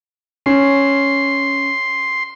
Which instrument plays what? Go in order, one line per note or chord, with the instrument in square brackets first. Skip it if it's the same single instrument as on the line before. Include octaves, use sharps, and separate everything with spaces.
[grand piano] C#4 [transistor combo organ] C6